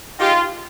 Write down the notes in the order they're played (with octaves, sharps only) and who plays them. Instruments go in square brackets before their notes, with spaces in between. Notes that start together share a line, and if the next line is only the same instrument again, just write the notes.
[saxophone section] D#3 G#3 D#4 G4 [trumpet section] F4